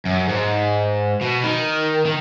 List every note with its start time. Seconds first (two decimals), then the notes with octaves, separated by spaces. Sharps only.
0.06 F#2
0.29 G#2
1.21 B2
1.44 D#3
2.06 D#3